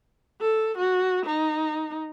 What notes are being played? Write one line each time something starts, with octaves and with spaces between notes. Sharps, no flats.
A4
F#4
D#4